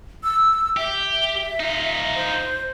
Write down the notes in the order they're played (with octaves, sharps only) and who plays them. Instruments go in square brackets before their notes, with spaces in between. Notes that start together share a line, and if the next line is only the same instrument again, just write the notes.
[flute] E6
[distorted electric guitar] G4 [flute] E5
[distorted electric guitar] D#4 F4
[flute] C5